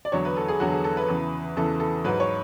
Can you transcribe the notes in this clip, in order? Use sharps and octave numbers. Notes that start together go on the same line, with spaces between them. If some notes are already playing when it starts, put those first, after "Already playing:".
D5
E2 D3 F#3 C#5
B4
A4
G#4
E2 D3 F#3 F#4
A4
G#4
A4
B4
E2 C#3 E3
E2 C#3 E3 A4
A4
G#2 F#3 B4
C#5